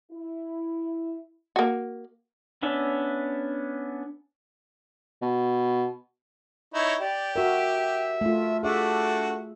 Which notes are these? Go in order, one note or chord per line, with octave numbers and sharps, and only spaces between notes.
E4
A#3 F#4
B3 C#4 D4 E5
B2
D#4 E4 C#5
G4 D5
F#4 A#4 E5
A3 F4
A3 D4 F#4 G#4 E5